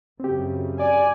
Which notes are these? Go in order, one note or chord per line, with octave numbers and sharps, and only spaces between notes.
F#2 C#3 C4 G4
D5 G#5